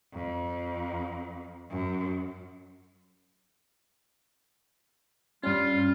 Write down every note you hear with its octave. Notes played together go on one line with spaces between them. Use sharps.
F2
F#2
G2 G3 C#4 F4